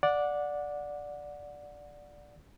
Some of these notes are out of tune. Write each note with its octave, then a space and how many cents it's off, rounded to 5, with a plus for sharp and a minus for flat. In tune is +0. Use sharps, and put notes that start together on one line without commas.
D5 +0 F#5 -20